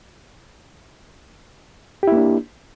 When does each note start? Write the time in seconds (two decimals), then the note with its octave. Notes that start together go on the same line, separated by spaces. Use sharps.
2.03 G4
2.08 E4
2.12 A#3
2.17 D4